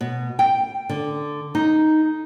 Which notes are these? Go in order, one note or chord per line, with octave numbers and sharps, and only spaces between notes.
B2
G5
D3
D#4